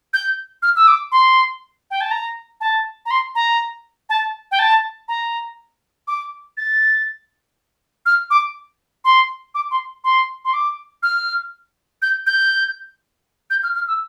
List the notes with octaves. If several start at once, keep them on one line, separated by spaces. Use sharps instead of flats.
G6
F6
E6
D6
C6
G5
A5
A#5
A5
A#5
C6
A#5
A5
G5
A5
A#5
D6
A6
F6
D6
C6
D6
C6
C6
C6
D6
F6
G6
G6
G6
F6
F6
E6